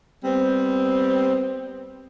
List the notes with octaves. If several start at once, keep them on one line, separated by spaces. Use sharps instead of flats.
G3 B3 C4